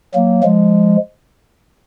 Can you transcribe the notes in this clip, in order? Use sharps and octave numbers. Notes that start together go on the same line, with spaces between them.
F#3 A#3
F3 G#3